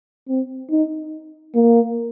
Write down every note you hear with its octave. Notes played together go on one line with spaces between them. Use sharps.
C4
D#4
A#3